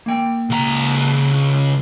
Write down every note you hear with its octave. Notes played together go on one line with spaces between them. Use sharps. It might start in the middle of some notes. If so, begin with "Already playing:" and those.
A#3 G5
C#2 A#5